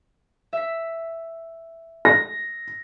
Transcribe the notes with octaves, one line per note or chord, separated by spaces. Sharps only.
E5 B6
A#6